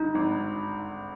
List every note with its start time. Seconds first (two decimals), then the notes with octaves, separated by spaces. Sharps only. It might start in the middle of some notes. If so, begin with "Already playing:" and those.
Already playing: G2 D3 D#4
0.15 G#1